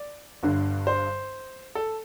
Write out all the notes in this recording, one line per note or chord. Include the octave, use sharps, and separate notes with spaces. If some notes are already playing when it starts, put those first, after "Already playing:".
Already playing: D5
G1 G2 D3
C5
A4